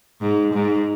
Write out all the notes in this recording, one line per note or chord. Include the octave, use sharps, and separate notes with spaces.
G#2
G#2